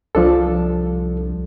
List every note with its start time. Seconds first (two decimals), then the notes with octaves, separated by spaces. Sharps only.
0.15 C2 F3 D4 A4